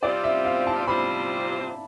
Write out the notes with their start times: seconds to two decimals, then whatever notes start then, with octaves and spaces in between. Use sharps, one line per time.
0.02 C3 G3 C4 F4 C5 D5
0.24 E5
0.45 F5
0.67 A5
0.87 C3 G3 C4 F4 C5 B5